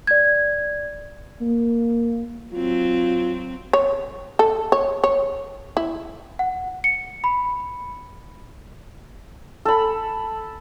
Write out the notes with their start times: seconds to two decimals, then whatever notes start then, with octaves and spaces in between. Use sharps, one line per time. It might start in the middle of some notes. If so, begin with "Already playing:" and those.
0.07 D5 G#6
1.41 A#3
2.53 F#3 C4 F4
3.73 C#5
4.39 A4
4.72 C#5
5.04 C#5
5.77 E4
6.39 F#5
6.84 C#7
7.24 B5
9.65 A4 B5